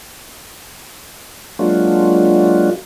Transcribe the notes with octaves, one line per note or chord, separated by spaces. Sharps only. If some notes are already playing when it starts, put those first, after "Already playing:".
F#3 G#3 A#3 D4 F4 F#4